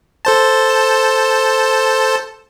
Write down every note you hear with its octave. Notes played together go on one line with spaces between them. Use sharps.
A4 C5 A5